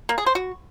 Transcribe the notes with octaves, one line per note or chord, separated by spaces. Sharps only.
A#3
G#4
C5
F#4